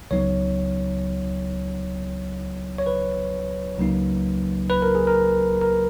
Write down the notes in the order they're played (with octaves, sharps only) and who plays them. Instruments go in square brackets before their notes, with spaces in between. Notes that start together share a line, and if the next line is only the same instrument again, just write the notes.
[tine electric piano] C#2 C#3 F#3 B3 D#4 C#5
C#5
B4
C#2 C#3 F#3 A#3 D#4
B4
A#4
G#4
A#4
A#4